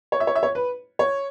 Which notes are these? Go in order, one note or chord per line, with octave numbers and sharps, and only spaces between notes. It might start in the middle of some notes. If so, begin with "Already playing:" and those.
C#5
E5
C#5
E5
C#5
B4
C#5